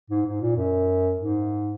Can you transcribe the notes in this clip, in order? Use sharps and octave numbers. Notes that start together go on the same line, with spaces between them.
G#2
G#2
A#2
F#2
G#2